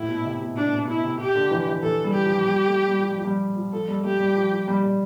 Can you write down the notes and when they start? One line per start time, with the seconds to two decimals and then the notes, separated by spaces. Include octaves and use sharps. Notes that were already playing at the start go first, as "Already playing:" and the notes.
Already playing: A2 E4
0.08 B2
0.25 C3
0.41 B2
0.56 B2 D4
0.73 B2
0.87 B2 E4
1.04 C3
1.20 G4
1.35 D3
1.51 E3
1.67 E3
1.83 E3 A4
2.04 G3
2.14 G4
2.25 F3
2.46 G3
2.68 A3
2.88 G3
3.01 F3
3.09 G3
3.18 F3
3.25 G3
3.56 F3
3.73 F3 A4
3.88 G3
4.00 G3
4.04 A3 G4
4.20 G3
4.35 F3
4.52 F3
4.68 G3
4.83 G3